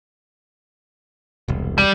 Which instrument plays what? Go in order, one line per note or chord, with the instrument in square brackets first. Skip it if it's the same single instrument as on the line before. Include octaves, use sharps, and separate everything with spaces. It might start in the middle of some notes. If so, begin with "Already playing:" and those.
[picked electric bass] E1 C2
[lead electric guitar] G3